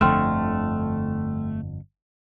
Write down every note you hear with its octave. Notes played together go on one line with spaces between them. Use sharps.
G1 F2 D3 A3 G5 C6 F6